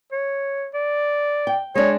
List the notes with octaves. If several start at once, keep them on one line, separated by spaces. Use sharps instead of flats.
C#5
D5
G5
G#3 D4 C#5